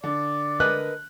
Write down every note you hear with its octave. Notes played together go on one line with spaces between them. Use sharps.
D3 D5
A#4 B4 D#5 F#6